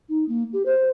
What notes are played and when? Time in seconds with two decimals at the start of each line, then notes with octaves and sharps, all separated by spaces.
0.09 D#4
0.29 A#3
0.53 G4
0.66 C5